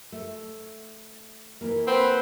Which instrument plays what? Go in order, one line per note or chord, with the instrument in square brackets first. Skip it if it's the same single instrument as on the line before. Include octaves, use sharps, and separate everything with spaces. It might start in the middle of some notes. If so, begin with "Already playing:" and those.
[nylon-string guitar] A3
E3 A#3
[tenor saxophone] C4 [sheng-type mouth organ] B4 F#5 B5